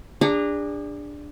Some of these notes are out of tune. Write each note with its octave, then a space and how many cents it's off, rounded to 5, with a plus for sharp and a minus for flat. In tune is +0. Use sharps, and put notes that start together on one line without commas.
D4 +0 G#4 -35 A#5 +0